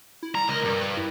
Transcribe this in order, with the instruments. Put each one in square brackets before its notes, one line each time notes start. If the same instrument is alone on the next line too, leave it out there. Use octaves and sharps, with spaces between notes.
[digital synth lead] E4
[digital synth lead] G3 [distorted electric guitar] A#5
[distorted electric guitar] C#2 D#5 [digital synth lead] A#4
[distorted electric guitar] G2
[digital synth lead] B4
E4